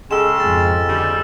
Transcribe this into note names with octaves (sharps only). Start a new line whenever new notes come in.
C#3 G#3 G4 A4 E6 E7
F2 G#2 A6
D3 G3